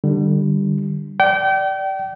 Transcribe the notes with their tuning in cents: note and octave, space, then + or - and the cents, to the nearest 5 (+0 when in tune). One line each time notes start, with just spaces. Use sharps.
D3 +25 G3 +0
D5 +0 G5 -35